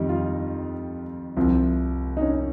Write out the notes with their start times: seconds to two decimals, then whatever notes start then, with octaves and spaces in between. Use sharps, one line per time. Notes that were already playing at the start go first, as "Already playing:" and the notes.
Already playing: F2 D#3 G3 D#4
0.09 F4
1.37 C2 C3 F3
2.17 D#4
2.21 C#4